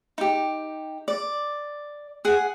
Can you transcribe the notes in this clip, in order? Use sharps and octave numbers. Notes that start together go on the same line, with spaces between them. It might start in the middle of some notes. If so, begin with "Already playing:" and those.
D#4 G4
D5
G#4 F#5